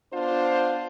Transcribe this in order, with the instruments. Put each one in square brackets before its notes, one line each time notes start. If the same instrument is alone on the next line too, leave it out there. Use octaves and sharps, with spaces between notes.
[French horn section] B3 D4 F4 C5